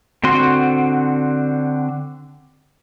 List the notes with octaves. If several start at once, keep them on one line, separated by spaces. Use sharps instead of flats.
D3 C4 F#4 C6